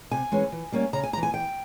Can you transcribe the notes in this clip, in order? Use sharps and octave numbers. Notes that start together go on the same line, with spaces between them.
C3 G#5
E3 G#3 C#4
E3
G3 A#3 C#4
C#3 A#5
G#5
E3 A#3 A#5
G#5
E3 G5